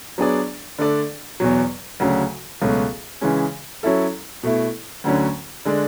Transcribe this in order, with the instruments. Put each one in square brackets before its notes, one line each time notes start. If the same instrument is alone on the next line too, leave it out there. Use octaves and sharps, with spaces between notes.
[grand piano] F#3 B3 D4 G#4 D5
D3 A3 D4 A4 D5
E2 B2 F#3
D2 C#3 F#3
C#2 B2 F#3 A3
C#3 E3 G#3 C#4
F#3 C#4 E4 A4
B2 A3 E4
D2 D3 F#3 C#4
D3 G#3 D4